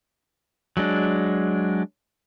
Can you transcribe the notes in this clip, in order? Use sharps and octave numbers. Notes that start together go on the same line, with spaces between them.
F#3 G#3 D4